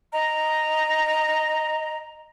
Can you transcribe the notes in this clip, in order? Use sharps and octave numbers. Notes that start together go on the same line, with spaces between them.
D#5 A#5